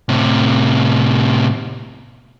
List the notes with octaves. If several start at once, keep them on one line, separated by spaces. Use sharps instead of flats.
A2 C3